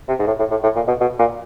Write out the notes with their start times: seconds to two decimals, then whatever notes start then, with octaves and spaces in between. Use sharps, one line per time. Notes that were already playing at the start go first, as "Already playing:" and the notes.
0.08 C3
0.19 G#2
0.27 A2
0.39 A2
0.51 A2
0.63 A2
0.76 A#2
0.88 B2
1.01 B2
1.19 A#2